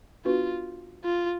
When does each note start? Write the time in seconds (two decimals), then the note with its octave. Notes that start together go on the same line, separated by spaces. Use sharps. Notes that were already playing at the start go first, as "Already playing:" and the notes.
0.25 B3 D4 F4 F#4 B4
1.04 F4